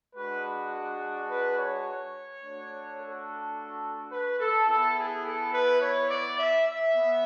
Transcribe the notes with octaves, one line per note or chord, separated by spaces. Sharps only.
G#3 D4 F#4 B4
B4
C#5
A3 D4 F#4
A4
B4
A4
B3 E4 A4
G#4
A4
B4
C#5
D5
E5
E5
B3